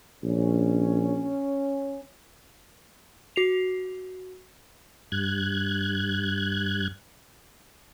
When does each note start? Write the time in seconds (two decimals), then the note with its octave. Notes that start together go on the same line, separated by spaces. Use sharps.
0.24 A#1 C#4
3.36 F#4 C7 F7
5.12 G2 F#6 G#6